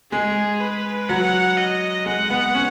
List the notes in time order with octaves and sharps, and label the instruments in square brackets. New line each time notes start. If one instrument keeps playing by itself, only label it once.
[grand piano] G#3 [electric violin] G#4
[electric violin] B4
[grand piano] F#3 [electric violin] F#5
[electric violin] D#5
[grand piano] G#3 [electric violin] F#5
[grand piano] B3
C#4